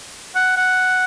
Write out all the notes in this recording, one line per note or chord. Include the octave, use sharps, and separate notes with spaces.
F#5
F#5